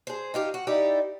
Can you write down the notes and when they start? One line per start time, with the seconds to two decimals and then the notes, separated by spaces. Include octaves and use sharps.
0.07 G#4 C5
0.34 D#4 F4 G4
0.54 F#4
0.67 D#4 E4 G4 D5